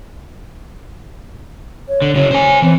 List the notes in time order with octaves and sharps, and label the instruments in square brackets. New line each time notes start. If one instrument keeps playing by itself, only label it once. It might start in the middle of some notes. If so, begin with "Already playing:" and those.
[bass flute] C#5
[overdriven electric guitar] D3
[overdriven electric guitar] C#3 F#3 [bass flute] C#5
[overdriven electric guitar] C5 G#5
[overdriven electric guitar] E3 [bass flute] C4